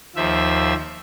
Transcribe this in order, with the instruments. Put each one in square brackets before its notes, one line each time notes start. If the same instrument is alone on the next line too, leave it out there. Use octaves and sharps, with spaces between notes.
[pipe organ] D#2 F3 E5